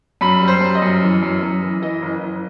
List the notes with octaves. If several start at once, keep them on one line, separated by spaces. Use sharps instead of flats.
F#2 B5
G3
C5
F#2
D#5
F#2
E3
F#2
F#2
E3
E3 D#5
F#1
F#1